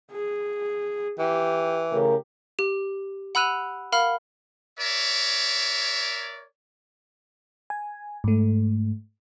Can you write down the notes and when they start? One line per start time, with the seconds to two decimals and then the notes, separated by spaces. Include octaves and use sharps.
0.12 G#4
1.19 E3 G4
1.92 A2 C#3 G4 A#4
2.59 G4
3.35 F#5 B5 E6 F#6 D#7 F7
3.92 A#4 F5 F#5 B5 F6
4.80 A#4 C#5 D5 E5
7.70 G#5
8.24 G#2 A3